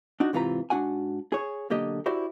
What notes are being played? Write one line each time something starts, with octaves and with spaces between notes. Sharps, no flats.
D4 D#4 F#4
G#2 C3 E3 F4 B4 A#5
G#2 D4 F#4 F#5 G#5
G#4 C#5
B1 D3 A#3 G4 D#5
E4 F#4 G4 C5 D5